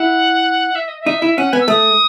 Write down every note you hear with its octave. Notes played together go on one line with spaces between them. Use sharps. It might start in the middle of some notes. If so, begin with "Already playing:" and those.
Already playing: E4 F#5
E5
D#5
E5
D#4
E4
C#4 F#5
B3 G#5
E6
A3 D#6